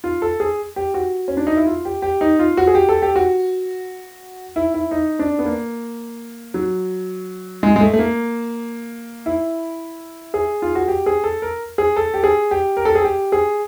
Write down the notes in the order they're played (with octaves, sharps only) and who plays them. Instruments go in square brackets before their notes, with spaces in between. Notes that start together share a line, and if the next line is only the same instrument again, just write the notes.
[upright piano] F4
A4
G#4
G4
F#4
C#4
D4
D#4
E4
F4
G4
G4
D#4
F4
F#4
G#4
G4
A4
G4
F#4
E4
E4
D#4
D4
B3
A#3
F#3
G#3
G#3
A3
A3
A#3
E4
G#4
F4
F#4
G4
G#4
A4
A#4
G#4
A4
G4
G#4
G4
A#4
A4
G#4
G4
G#4